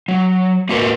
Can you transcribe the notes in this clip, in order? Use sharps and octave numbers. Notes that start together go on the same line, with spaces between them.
F#3
A#3 F#4 A#4 B4